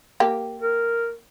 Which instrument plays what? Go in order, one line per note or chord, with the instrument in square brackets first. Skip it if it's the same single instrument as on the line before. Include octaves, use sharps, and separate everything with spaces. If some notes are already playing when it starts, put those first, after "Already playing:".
[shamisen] A#3 G4
[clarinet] A#4